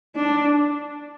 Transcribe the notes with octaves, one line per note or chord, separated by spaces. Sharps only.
D4